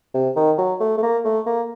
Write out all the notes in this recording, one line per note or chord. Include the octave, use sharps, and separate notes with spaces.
C3
D#3
F#3
A3
A3
A#3
A3
A#3